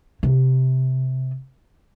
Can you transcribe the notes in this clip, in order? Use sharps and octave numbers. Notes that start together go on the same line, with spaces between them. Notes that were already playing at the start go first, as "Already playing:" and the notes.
C3